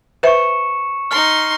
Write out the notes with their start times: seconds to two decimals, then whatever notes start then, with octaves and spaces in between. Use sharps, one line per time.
0.23 B4 C5 E5 C#6 C#7 E7
1.11 D#4 C6 F6 C#7